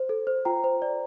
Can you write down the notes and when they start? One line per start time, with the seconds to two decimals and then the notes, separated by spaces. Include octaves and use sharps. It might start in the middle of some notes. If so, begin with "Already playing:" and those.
Already playing: C5
0.09 A4
0.27 C5
0.45 F4 G5 A#5
0.64 C5
0.82 D5